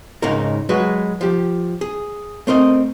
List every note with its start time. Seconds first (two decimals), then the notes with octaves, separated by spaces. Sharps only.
0.22 C#2 G#2 C#3 D#4 A#4
0.69 F#3 G#3 F#4 B4
1.21 F3 G4
1.81 G#4
2.47 A3 C4 A#4 D#5